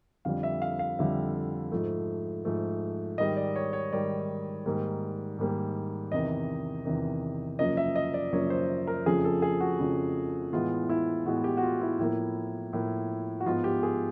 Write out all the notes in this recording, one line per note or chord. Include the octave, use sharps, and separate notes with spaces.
F2 D3 G3 F5
E5
F5
F5
F2 D3 G3 E5
G#2 F3 A3
G#2 F3 A3
G#2 D#3 G3 D#5
D5
C#5
C#5
G#2 D#3 G3 D5
G#2 D#3 G3 A#3
G#2 D#3 G3 A#3
E2 C3 D#3 D#5
E2 C3 D#3
F#2 C#3 F3 A#3 D#5
E5
D#5
D5
F#2 C#3 F3 A#3 C#5
C5
A#4
F2 C#3 F3 A3 G#4
A4
G#4
F#4
F2 C#3 F3 A3
A2 E3 G#3 B3 F4
E4
A2 E3 G#3 B3 F#4
G4
F#4
F4
E4
A2 F3 A#3 E4
A2 F3 A#3
F#4
G#2 F3 G#3 B3 F4
G4
G#4